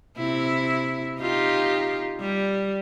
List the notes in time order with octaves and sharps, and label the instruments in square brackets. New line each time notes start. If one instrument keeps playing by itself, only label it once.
[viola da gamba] C3 E4
D#4 F4 G4
G3